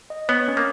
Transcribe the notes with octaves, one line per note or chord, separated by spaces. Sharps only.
D#5
B3 C#5
C#4
A#3